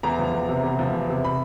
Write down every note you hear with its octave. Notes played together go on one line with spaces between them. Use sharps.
E2 A#5
F3
E2
C3
E2
F3
E2
C3
B5